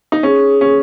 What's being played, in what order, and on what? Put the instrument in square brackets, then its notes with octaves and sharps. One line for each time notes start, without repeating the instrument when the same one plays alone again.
[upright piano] D#4
[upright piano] C#4 [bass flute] G#4
[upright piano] C#4